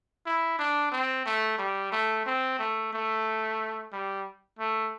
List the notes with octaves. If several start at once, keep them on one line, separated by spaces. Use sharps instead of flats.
E4
D4
C4
A3
G3
A3
C4
A3
A3
G3
A3